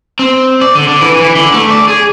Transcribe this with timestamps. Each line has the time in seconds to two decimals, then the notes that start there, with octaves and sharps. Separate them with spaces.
0.19 C4
0.61 D5
0.75 D3
0.88 D3
1.01 E3
1.21 E3
1.35 D3
1.54 A3
1.70 D5
1.88 G#4